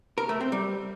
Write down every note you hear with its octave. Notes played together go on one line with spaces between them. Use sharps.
A#4
A3
C4
G3